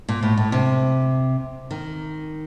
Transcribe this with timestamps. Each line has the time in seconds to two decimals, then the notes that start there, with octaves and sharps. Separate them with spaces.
0.09 A#2
0.23 A2
0.37 A2
0.52 C3
1.71 D#3